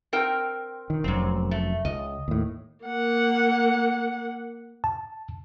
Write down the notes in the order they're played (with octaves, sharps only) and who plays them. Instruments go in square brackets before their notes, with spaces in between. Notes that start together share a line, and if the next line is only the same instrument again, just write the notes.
[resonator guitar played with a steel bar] C4 A#4 G5
[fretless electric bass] D#3
[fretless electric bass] F1 F#2 [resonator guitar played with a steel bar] A#2 C4
[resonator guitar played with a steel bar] A3
[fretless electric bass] C#2 [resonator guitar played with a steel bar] D#5
[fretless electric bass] D#2 A2
[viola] A#3 F#5
[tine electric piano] A5